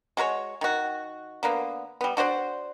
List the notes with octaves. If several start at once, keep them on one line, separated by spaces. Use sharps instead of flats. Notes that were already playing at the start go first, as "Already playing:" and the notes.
G#3 F#4 A#4 C#5
D#3 F#4
D3 A#3 B3
G3 B3
D4 F#4 C5 D5